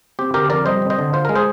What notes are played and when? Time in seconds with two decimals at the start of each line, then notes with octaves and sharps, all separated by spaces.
0.19 C4 G4
0.34 D3 G4 A#4
0.50 F2 A#4 D5
0.66 G3 C5 D#5
0.82 C4
0.90 C5 D#5
0.98 D3
1.13 F4 C5
1.25 G#3 A#4
1.35 G#4 C5